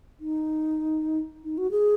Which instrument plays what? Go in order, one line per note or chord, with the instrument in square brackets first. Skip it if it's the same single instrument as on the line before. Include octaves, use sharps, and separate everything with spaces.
[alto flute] D#4
D#4
F#4
G#4